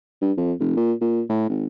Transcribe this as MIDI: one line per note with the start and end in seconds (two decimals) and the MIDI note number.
0.21 0.32 43
0.37 0.53 41
0.60 0.72 29
0.77 0.93 46
1.01 1.22 46
1.29 1.47 45
1.49 1.66 32